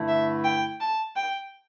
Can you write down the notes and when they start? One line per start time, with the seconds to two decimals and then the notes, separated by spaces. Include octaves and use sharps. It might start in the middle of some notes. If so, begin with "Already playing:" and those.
Already playing: G2 D3 A3 E4
0.08 E5
0.44 G5
0.80 A5
1.16 G5